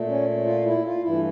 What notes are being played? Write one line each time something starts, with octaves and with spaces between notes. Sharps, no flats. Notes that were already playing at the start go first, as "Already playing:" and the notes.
Already playing: A#2 A3
C#4
F4
E4
F4
G2 E3 A3 E4